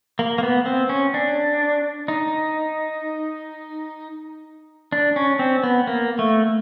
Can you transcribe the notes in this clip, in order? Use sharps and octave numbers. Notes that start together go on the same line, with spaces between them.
A#3
A#3
B3
C4
C#4
D4
D#4
D4
C#4
C4
B3
A#3
A3